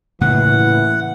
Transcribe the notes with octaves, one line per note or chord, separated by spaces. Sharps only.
A2 C#3 E3 A#3 F#5